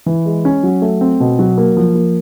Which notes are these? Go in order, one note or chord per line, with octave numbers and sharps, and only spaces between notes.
E3
G#3
C#4
F#3
A3
C4
B2
F#3
A#3
F3
A#3